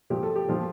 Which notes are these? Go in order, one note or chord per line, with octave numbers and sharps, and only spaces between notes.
A#2 F3 G4
A4
G4
A#2 F3